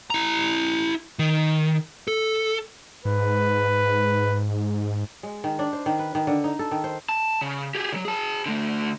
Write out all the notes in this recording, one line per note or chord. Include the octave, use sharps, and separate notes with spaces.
E4 A#5
D#3
A4
G#2 B4
G#3
D#3
D4
C5
D#3
B4
D#3
D3
D#4
A4
D#3
C5
A5
C#3
G4 G#4
C#3 F#3
G#4 A5
D3 A3